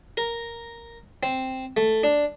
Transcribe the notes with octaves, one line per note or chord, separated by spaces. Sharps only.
A#4
C4
A3
D4